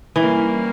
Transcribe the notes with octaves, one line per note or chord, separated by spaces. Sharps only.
E3 G3 A#3 C#4 E4